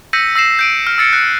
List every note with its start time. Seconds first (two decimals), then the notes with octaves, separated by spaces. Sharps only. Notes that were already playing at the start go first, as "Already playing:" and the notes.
0.13 E6 G6 A#6 B6 C#7 D#7
0.36 E6 A#6 C7 E7
0.59 G6 D7 D#7
0.87 F6
0.98 E6 A6 C#7
1.13 F#6 A#6